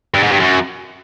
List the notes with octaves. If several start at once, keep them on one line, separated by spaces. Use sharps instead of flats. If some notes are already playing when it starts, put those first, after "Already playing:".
G2
G#2
G2
F#2